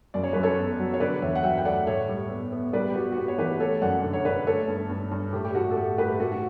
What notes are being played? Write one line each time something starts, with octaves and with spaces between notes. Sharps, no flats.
F#2 D5
C#5
F#2 B4
A4 C#5
B3
F#3
C#5
D3 B4 D5
E2 C#5 E5
F#5
F#3 E5 G5
G5
A3 D5 F#5
A2 C#5 E5
G3
B3
B3
G3 B4 D5
G4
B3 F#4
F#4
B3 G4
C#5
E3 G4 B4
A3 A4 C#5
F#2 D5 F#5
D3
C#5
D3 B4 D5
A3 A4 C#5
G2
G2
G2
A2 G4
G4
A2 F#4
A4
A3 G4
A2 G4 B4
A3 F#4 A4
F#4